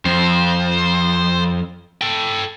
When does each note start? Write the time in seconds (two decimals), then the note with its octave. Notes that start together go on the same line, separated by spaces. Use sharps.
0.06 F2 C5
2.01 A4 G5